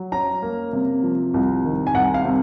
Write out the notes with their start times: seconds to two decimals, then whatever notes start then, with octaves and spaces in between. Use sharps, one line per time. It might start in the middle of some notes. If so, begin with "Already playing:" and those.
Already playing: F#3
0.12 C#4 A#5
0.42 A#3
0.73 C3
1.03 F3
1.34 C2
1.65 D#3
1.87 G#5
1.94 C2 F#5
2.14 F5
2.25 C3